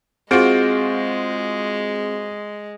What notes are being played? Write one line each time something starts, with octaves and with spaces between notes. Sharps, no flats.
G#3 C4 F4 F#4 G#4 C5 D7